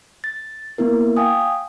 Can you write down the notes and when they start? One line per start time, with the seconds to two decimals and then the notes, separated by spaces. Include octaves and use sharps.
0.24 A6
0.78 A#3 B3 E4 A#4
1.16 F5 G5 G#5 D#6